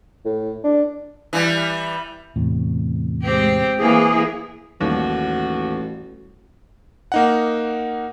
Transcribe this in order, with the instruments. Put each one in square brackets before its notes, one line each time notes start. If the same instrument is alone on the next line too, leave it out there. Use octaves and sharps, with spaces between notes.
[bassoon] A2
D4
[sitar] E3 G3
[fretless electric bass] E2 A2 C3
[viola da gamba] G#3 C4 G4
[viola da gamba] E3 A#3 [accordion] G#4
[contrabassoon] A1 [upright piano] D#2 [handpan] G3 [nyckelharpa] F#4
[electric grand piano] A#3 D#4 F#5